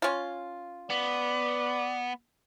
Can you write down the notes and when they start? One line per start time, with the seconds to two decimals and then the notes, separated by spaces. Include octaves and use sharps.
0.02 C#4 F4
0.90 B3 D5